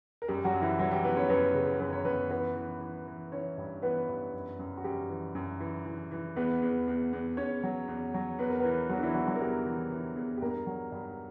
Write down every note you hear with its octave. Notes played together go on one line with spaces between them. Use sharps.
A#4
F#2 G3 G4
F#3 F#4
F#2
E3 E4
E3 F#3 F#4
G3 G4
E3 B3 B4
C#4 C#5
F#2 B3 B4
C#3
F#2 B4
C#5
F#2 B3 B4
E3 B3 B4
E3
E3
E3
E3 C#4 C#5
G2
E3 B3 B4
G2
F#2
F#2
F#4
F#2 G3 G4
E3
F#2
E3
E3
E3
E2 B3 B4
E2
E2
E2
E2 C#4 C#5
F#3
E2
F#3
E2 B4
A#4
E3 B3 B4
E2 F#3 F#4
D4
E3 E4
E2 F#3 F#4
F#3 F#4
A#4
E2 G3 G4
E3
E3
E2
G4
G2 A#3 A#4
F#3
G2